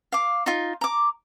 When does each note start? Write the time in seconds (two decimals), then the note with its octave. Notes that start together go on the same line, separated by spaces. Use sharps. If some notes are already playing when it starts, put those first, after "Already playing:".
0.12 F5 D6
0.46 D#4 F4
0.81 A#5 D6